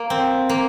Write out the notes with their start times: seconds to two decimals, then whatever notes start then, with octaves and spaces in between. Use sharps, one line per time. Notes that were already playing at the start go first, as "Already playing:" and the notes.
Already playing: A#3
0.10 C4
0.49 A#3